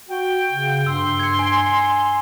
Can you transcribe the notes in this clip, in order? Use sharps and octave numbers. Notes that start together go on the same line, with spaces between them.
F#4 G5
C#3
G2 C6 E6
G#6 C#7
G#5
C6